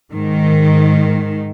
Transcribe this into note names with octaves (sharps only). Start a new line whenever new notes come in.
G#2 D#3